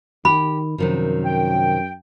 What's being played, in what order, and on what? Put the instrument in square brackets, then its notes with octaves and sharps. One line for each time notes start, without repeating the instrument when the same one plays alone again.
[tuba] D#3 [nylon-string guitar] G4 [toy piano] B5
[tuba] F#2 [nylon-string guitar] C3 D#3 F3
[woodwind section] G5